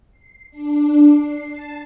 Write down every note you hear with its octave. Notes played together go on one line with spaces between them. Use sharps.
C7
D4
C7
A5